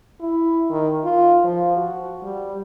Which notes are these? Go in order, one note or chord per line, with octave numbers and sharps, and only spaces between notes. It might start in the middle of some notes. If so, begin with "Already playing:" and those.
E4
D#3
F4
F3
F#4
G3